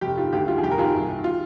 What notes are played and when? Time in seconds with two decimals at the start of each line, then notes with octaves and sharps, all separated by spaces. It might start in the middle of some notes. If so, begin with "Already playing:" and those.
0.01 F1 G4
0.17 D#3 F4
0.32 D2 G4
0.48 D#3 F4
0.58 G#4
0.63 F1 G4
0.71 A#4
0.78 D#3 F4 G#4
0.94 C2
1.09 D#3
1.24 F4